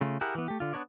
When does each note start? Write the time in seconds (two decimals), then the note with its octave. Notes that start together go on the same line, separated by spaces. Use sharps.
0.01 C#3 A3 F4
0.21 E4 G4 G#4 A#4 F#5
0.35 E3 B3
0.48 A3 G4
0.60 D3 F4
0.73 B3 D4 A#4 C#5 D5